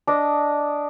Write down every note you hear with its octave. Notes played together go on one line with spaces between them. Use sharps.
D4 D#5